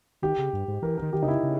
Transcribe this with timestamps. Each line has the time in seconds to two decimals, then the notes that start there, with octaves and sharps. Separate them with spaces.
0.22 D#3 G4
0.39 C#3
0.53 G2
0.68 G#2
0.82 E3 A#4
0.98 D#3 A#4
1.13 D#3 G4
1.23 C#3 D#4
1.28 E4
1.43 C#3